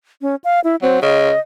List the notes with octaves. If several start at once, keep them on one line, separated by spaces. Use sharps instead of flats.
C#4
F5
E4
F#3 C4
C#3 D#5